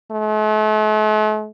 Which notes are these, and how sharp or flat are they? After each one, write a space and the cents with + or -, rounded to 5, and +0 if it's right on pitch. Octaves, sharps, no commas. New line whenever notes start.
A3 -45